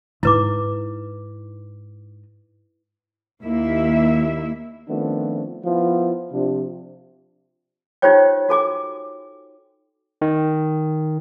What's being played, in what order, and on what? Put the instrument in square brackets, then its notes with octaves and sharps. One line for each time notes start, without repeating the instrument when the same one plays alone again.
[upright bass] G#2 D#4 [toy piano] E4 B4 D6
[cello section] D#2 A#3 E4 E5
[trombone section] D#3 F3 A3 B3 C4 D4
F3 B3 E4 F4
C3 F3 D4
[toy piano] D#4 F4 G4 C5 C#5 G5
F#4 A4 G#5 D6
[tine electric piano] D#3